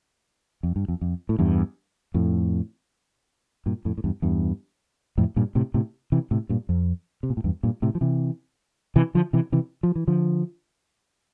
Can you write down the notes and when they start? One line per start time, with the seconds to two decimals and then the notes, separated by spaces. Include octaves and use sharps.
0.63 F2
0.76 G2
0.88 F2
1.01 F2
1.29 A2
1.39 E2 G2
2.14 F2 A2
3.66 G2 A#2
3.85 F2 A2
3.98 A2
4.04 E2 G2
4.22 E2 G2
5.18 F2 A2
5.36 G2 A#2
5.55 A2 C3
5.74 A2 C3
6.12 C3 E3
6.31 A2 C3
6.49 G2 A#2
6.69 F2
7.23 C3
7.30 A#2
7.37 A2
7.44 E2 G2
7.63 G2 A#2
7.82 A2 C3
7.95 F3
8.01 C3 E3
8.96 C3 E3
9.15 D3 F3
9.33 C3 E3
9.52 C3 E3
9.83 F3
9.96 E3
10.07 D3 F3